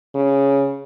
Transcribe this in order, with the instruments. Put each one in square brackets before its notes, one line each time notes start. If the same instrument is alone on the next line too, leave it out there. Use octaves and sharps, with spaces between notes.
[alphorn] C#3